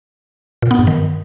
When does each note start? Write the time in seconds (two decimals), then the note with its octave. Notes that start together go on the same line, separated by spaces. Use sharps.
0.62 A#2
0.71 B3
0.79 G2
0.87 D#3